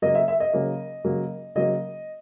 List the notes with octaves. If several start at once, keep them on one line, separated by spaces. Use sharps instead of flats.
C#3 F#3 A#3 D#5
E5
E5
D#5
C#3 F#3 A#3
C#3 F#3 A#3
C#3 F#3 A#3 D#5